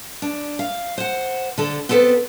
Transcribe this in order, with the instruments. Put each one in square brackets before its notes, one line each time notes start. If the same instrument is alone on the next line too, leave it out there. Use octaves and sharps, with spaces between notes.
[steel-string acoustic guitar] D4
F5
C5 F#5
D3 A4
B3 C4 A4 B4 C5